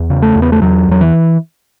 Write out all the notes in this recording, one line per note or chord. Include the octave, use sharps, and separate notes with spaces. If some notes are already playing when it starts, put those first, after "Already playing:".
Already playing: E2
C#3
A3
E2
B3
A3
E2 F#3
E2 F#3
E3